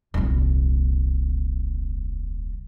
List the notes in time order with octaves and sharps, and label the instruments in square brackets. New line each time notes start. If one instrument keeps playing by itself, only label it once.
[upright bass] D#1 C2